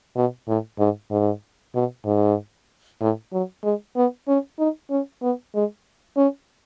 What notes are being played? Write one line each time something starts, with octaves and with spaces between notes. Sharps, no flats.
B2
A2
G#2
G#2
B2
G#2
A2
F#3
G#3
B3
C#4
D#4
C#4
B3
G#3
C#4